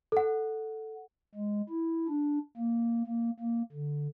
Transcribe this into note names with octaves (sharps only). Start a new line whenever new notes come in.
A4 F#5
G#3
E4
D4
A#3
A#3
A#3
D3